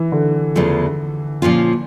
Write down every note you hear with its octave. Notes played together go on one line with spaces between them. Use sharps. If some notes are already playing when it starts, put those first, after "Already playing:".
Already playing: E3
D3
E2 C#3 F3 A3
A#2 F3 C#4 F4